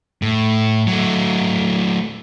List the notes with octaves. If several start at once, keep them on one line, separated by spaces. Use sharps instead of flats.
A2
F#3 A3